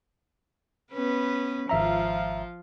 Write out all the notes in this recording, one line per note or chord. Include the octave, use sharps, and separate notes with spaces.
B3 C#4 B4
G#1 F3 F4 E5 A#5